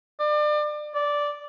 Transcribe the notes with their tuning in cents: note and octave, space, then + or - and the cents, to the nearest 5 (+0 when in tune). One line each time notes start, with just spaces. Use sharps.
D5 +35
D5 -10